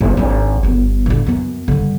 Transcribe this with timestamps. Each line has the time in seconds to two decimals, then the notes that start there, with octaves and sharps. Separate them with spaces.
0.01 G1
0.17 G#1 D4
0.63 G1 B3
1.06 A2 D3
1.26 F#2 B3
1.68 G2 D3